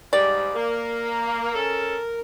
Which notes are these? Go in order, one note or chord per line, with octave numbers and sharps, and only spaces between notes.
G#2 G3 D5
A#3 A#4
C#4 A4